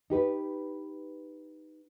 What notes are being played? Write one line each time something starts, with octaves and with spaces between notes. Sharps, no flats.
D#4 G4 B4